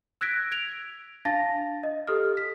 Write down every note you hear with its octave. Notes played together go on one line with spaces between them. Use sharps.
E6 F#6 G#6 A#6 B6 D7
G#6 D7 F7
D4 F5 A5 A6 A#6
D#5
G4 A4 D#6 F6
B6